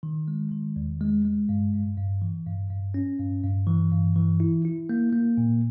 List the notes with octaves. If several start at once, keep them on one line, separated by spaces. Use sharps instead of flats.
D#3
G#3
D#3
E2
G#3
G#3
G2
G2
G2
E3
G2
G2
C#4
G2
G2
E3
G2
E3
E4
E4
A#3
A#3
A#2